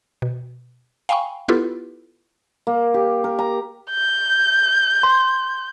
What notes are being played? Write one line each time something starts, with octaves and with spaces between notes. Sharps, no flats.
B2
F5 G5 G#5 B5 C#6
B3 E4 F4 G4 A4 B4
A#3
G4
A#4
A#5
G6
C6